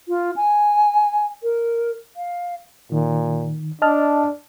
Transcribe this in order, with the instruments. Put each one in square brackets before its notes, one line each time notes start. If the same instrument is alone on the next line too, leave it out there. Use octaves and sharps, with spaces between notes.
[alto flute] F4
G#5
A#4
F5
[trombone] A#2 [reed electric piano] D#3
[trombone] D4 [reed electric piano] D#5 A5 F6